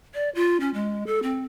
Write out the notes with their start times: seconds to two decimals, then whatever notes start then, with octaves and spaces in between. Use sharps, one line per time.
0.14 D5
0.35 F4
0.60 C#4
0.74 G#3
1.07 A4
1.23 C4